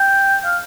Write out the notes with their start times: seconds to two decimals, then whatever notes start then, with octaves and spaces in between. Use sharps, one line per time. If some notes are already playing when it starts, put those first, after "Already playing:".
Already playing: G5
0.44 F5